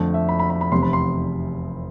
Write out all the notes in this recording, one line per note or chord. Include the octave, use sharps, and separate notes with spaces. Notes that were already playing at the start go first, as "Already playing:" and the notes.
Already playing: F2 D3 A3
E5
B5
B5
B5
B5
F1 E2 C3 C6
B5
C6